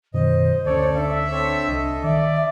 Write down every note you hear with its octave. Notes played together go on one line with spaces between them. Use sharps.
F#2 B2 D#3 C5 D#5
D2 C#4 A4 C#5 D5
D4 E5
C4 A4 C#5
C2 A4 D#5
D#3 D5 E5